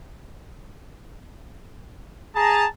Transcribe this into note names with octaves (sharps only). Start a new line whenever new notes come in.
G#4 A5 A#5